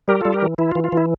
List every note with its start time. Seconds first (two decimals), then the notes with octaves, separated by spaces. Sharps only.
0.08 G3 G4 A#4
0.21 G3 F4 A4
0.33 G4 A#4
0.42 E3
0.58 E3 E4
0.71 F4
0.75 E3
0.84 F4
0.92 E3 E4